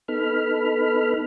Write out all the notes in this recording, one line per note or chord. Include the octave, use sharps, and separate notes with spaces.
B3 D#4 A4 B5 F6